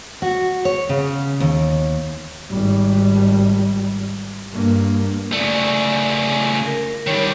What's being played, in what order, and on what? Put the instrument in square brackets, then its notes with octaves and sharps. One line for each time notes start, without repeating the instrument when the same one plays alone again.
[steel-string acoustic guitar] F#4
C#5
C#3
D#2
[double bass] G#1 G3
G2 A#3
[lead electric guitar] C#3 A3 [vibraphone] D5
[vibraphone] A#4
[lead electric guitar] D#3 G3 [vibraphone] C#5